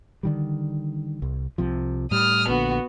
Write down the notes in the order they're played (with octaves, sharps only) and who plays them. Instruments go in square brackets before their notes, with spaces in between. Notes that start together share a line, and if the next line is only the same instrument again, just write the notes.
[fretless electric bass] D3 D#3 G3
C2
C2 C3 F3
[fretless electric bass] A2 G3 [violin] D#6 F6
[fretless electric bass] A#1 A#2 D3 [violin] B3 F#4